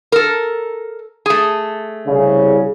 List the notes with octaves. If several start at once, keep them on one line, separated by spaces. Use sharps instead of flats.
A4 A#4
A3 G#4
C2 C#3